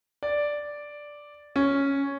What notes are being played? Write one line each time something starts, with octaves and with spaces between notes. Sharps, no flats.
D5
C#4